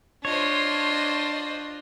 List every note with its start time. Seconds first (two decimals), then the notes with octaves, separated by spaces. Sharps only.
0.25 D4 F4 C5 C#5 D#5